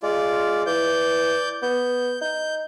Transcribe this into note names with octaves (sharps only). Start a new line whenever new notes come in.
G#3 F4 D5
E3 D5 G6
B3 G6
D#4 G6